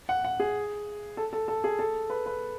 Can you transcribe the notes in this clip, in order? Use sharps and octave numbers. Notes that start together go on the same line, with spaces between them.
F#5
F#5
G#4
A4
A4
A4
G#4
A4
B4
B4